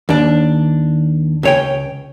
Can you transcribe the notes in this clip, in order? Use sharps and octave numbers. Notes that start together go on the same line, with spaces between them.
D#2 D4
C#2 C#5 G5